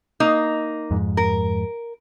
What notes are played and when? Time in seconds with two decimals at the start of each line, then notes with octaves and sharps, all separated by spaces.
0.20 A#3 D#4
0.91 F2 G#2
1.17 A#4